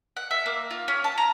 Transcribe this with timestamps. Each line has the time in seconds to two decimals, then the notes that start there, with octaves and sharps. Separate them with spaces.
0.17 F#5
0.31 E5
0.46 A#3
0.71 F4
0.88 C#4
1.04 A5
1.18 A#5